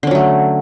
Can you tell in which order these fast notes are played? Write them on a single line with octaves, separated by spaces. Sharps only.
D3 C#4 F#3 A3